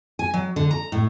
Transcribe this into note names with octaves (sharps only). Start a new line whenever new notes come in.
G#5
F#3
D3
A#5
A2